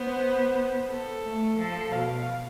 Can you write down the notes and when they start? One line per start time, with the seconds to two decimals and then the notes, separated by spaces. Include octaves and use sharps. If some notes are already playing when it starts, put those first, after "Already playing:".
Already playing: B3 C5
0.90 A4
1.24 A3
1.58 F3 A4
1.92 B2 F5